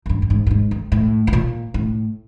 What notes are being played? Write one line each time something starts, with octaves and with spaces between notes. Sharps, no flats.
F#2
G2
G2
G#2
A2
G#2
F2
A2
A2
A#2
A2